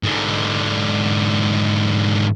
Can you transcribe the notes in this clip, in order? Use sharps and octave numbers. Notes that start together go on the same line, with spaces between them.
G#2 D3